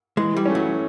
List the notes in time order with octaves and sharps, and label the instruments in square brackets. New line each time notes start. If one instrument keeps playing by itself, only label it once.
[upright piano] E3 [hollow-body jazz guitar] G#3
[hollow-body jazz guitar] G3
[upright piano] A3 C#4
[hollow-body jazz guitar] F#3